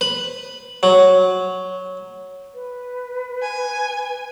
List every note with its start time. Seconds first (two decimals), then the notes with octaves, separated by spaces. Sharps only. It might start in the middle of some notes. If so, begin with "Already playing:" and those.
0.01 B4
0.83 F#3
2.55 B4
3.42 G#5